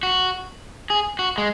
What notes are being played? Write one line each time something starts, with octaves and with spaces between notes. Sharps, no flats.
F#4
G#4
F#4
G#3